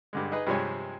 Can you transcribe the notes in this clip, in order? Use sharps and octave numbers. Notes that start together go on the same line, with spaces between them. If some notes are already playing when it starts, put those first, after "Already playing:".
G2 D3 G#3
D#4 G#4 B4 D#5
G2 C3 F3 G#3 C#5 G#5